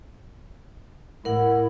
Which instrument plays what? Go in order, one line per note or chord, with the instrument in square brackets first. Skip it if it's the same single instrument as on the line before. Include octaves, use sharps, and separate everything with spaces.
[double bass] A2 E4 [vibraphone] A#4 F#5